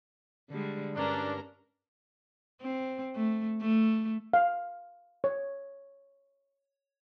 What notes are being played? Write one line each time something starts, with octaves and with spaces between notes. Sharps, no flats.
D3 G3 G#3
G2 C#4 D4 A#4 A#5
C4
A3
A3
F5
C#5